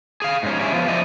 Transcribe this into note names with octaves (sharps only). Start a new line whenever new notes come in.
G#4 F5
G#2 C#4
G3 C#4 D4 E4 G#4
F3 B3 F4
F3 A3 E4 D5 D#5